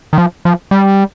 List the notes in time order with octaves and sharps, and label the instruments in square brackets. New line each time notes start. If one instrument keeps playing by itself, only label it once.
[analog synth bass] D#3
F3
F3
G3